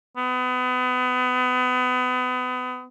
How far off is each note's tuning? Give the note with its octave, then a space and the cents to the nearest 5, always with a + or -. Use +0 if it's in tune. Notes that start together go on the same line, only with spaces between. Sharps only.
B3 +30